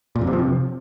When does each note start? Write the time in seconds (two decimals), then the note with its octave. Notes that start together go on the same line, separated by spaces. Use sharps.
0.16 A#2
0.21 F2
0.27 C3
0.33 F3
0.39 C3